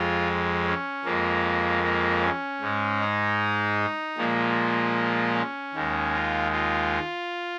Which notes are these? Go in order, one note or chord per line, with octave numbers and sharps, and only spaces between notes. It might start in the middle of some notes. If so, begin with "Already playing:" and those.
Already playing: F2 F3 G#3 F4
C#4
F2 F3 G#3 A#3
A#3
C#4
G#2 G#3
D#4
A#2 F3 G#3 A#3
C#4
D#2 D#3 G#3
F4
F4